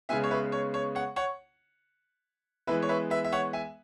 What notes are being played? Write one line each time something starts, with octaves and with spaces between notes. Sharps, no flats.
C#3 G#3 B3 E5 G#5
C#5
B4 E5
C#5
C#5
C#5 F#5
C#5 F#5
E3 G#3 B3 B4 E5
C#5
B4 E5
B4 E5
E5
C#5 F#5
E5 G#5